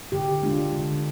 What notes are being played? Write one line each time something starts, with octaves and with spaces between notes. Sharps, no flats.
D3 G4
G#3 D4 F4
D3